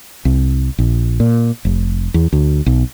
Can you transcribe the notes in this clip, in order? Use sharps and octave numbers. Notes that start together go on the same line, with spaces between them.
C2
A#1
A#2
F1
E2
D2
B1